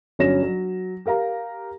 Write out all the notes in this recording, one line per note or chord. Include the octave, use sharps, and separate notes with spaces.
G1 F#3 C#4 C#5 A#6 E7
F#3
G4 A#4 F5 A#5